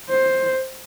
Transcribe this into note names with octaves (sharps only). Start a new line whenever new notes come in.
C5